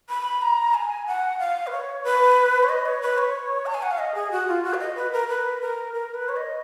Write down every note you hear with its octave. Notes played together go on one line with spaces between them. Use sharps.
B5
A#5
G#5
F#5
F5
B4
C#5
B4
C#5
D#5
C#5
B4
C#5
A#5
G#5
F#5
F5
D#5
G#4
F#4
F4
F#4
F5
D#5
B4
A#4
B4
A#4
A#4
B4
C#5
D#5